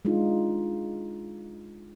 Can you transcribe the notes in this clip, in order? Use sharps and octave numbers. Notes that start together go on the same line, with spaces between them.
G#3 D4 D#4 F4